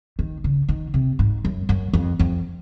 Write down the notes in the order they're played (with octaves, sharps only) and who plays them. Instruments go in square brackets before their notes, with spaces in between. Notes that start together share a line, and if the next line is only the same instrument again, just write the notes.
[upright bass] D#3
C#3
D#3
C3
G#2
F#2
F#2
F2
F2